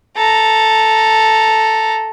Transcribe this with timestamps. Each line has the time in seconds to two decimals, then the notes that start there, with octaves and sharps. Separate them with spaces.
0.17 A4 A#5